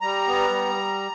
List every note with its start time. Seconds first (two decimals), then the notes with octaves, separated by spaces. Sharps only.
0.01 G3 A#5
0.27 B3
0.50 G3